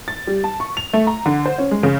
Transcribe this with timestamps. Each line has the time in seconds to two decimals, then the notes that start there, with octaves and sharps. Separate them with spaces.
0.08 A6
0.27 G3
0.44 A5
0.60 C#6
0.77 F7
0.93 A3
1.07 A#5
1.26 D3
1.46 C5
1.58 C#4
1.71 G#3
1.83 C#3